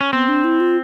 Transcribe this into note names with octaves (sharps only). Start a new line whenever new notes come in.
C#4
B3 C4
D4
E4
F4